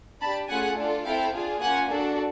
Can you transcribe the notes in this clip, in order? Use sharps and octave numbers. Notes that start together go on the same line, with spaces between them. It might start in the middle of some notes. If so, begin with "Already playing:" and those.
D4 G4 A5 B5
A3 C#4 F4 G#4 F#5 G#5
D4 F4 A4
C4 E4 A4 F5 G5
D4 F4 G#4
A#3 C#4 F4 F#5 G#5
D4 F#4 A4